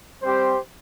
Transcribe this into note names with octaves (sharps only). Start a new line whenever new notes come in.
G3 C4 G4 C5